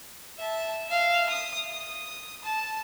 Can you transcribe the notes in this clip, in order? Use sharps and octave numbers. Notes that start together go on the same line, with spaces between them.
E5 A5
E5 F5
D#6
D#6
A5